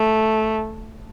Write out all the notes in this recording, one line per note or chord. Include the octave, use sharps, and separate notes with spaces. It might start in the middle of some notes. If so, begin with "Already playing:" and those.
Already playing: A3